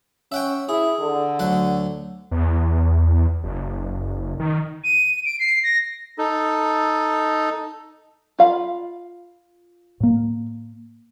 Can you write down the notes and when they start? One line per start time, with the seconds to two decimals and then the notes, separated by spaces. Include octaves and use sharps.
0.32 C#4 E5 F#5 G5
0.69 E4 G#4
1.00 D3
1.39 D2 F#3 F#5
2.31 E2
3.44 F#1
4.40 D#3
4.84 D#7
5.25 D7
5.40 C7
5.64 A#6
6.18 D#4 A4
8.39 F4 F5 B5
10.00 A2 A#3